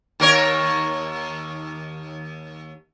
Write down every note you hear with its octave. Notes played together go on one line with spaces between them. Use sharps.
D#2 A#4 C#5